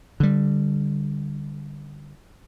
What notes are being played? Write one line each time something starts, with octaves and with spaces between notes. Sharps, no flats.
D3 G3